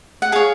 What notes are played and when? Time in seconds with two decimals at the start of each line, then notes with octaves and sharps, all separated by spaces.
0.22 F#5
0.32 G#4 C#5 F5